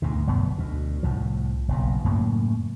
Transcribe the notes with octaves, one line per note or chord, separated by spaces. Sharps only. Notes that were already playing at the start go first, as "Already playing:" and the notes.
D2 G#2 B2
G1 F#2 B2 B3
D2 B2
C2 A2 F3
F#1 B1 B2
F#2 A2 C#3 A#3